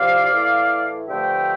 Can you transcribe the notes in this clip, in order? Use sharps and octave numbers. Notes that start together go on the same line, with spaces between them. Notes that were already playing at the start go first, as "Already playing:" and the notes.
Already playing: C2 C3 F3 C4 D5 F5
A2 E3 A3
G2 D3 F3 A3 C4 E5 G5